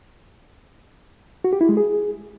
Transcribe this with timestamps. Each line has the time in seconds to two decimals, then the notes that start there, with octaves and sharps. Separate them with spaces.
1.44 F#4
1.53 G4
1.61 E4
1.69 G#3
1.77 G#4